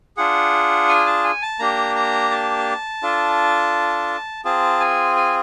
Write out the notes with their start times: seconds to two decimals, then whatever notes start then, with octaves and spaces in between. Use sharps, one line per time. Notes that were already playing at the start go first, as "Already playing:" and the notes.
0.17 D4 F4 G#4 F#5
0.88 G#5
1.06 A5
1.24 G#5
1.42 A5
1.59 A#3 D4 G4 A#5
1.95 A#5
2.31 A5
3.02 D4 F4 A4
4.45 C4 F4 G#4 A5
4.80 G#5
5.16 G#5